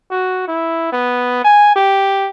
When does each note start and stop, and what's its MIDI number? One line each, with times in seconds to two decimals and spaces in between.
0.11 0.44 66
0.48 0.89 64
0.92 1.42 59
1.44 1.72 80
1.76 2.29 67